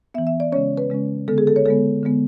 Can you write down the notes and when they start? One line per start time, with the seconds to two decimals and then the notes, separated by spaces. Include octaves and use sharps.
0.14 B3 E5
0.18 E3
0.27 E5
0.40 D5
0.52 C#3 G#3 C#4 C#5
0.78 B4
0.90 C#3 G#3 C#4
1.28 D3 G#3 B3 A4
1.38 G#4
1.47 A4
1.56 C#5
1.65 D3 G#3 B3 A4
2.03 D3 G#3 B3